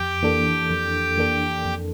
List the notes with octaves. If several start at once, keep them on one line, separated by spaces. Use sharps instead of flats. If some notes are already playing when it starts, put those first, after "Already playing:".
Already playing: F2 G4 G5
E3 A#3 D4 A4
F2
E3 A#3 D4 A4
F2